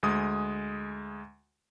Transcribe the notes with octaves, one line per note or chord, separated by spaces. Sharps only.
D2 G#3 D#6